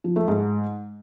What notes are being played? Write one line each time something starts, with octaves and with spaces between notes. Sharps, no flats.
F3
A3
G#2